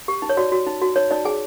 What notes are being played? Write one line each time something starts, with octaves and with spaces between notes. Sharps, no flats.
G4
D#4
C#5
F#4 D5
F#4
D#4
F#4
D#4 C#5
D#4 D5
G#4 G#5